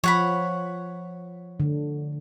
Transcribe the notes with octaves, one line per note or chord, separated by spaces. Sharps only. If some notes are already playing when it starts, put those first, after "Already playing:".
F3 C#5 F#5 B5
D3